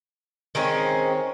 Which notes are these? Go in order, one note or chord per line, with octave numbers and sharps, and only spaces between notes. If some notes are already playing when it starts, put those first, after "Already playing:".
D#3 G#3 C4 C#4